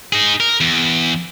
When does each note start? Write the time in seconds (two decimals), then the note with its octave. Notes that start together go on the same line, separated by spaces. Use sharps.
0.13 D#4 G#4
0.40 A#4
0.61 E2